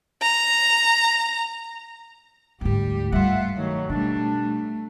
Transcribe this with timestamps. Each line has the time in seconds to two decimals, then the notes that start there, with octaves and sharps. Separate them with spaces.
0.22 A#5
2.61 D2 G#2 G3 G4
3.12 G2 G3 A3 F4 E5 F#5
3.55 B2 D#3 F#3 A3
3.90 B2 G3 A3 D4
4.41 A3